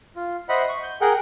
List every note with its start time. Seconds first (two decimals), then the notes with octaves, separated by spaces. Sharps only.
0.16 F4
0.49 C5 D#5 E5 F#5 B5
0.69 C#6
0.83 G6
1.01 G#4 A#4 F#5 G5